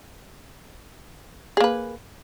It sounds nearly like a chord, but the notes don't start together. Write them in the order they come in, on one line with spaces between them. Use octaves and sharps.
G#4 A#3 B4